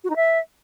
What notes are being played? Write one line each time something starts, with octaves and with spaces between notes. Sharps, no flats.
F#4
D#4
E5